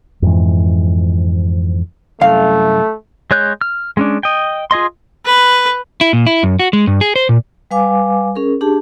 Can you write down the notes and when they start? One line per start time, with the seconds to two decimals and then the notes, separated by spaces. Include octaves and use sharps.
0.22 F2 G#2 E3
2.21 C2 F#2 A3 F5
3.31 G#3 C#5 F#6 G6
3.61 F6
3.97 G#3 C#4 D4
4.23 D#5 G5
4.71 F4 G#4 D#5 C6
5.26 B4
6.01 E4
6.13 A#2
6.27 E4
6.43 F#2
6.59 F#4
6.73 G#3
6.87 G2
7.01 G#4
7.16 C5
7.29 A#2
7.71 G3 B4 F5 G#5 D6
8.35 C#4 G#4 A#4
8.61 D4 G4 G#4 A5